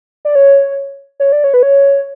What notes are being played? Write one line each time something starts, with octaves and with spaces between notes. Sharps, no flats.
D5
C#5
C#5
D5
C#5
B4
C#5